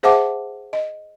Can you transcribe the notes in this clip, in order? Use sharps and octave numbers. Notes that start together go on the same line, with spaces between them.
G#4 C5 E5 F#5 A5 D6
D#5